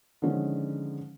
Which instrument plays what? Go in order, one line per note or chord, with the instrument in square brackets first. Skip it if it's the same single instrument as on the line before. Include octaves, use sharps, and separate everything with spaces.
[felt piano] D3 D#3 F3 G#3 C#4